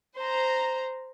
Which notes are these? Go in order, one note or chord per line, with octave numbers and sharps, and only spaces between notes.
C5 A#5